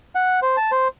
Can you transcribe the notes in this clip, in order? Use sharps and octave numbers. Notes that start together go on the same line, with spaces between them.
F#5
C5
A5
C5